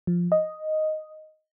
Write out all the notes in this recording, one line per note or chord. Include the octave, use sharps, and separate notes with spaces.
F3
D#5